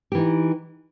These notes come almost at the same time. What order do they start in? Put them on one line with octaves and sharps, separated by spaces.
G4 E3 D#4